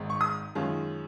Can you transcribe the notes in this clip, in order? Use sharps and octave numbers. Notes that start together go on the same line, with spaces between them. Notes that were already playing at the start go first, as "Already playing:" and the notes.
Already playing: G#1 G#2 D#3
C#6
D#6
F#2 D#3 G#3 C#4 F4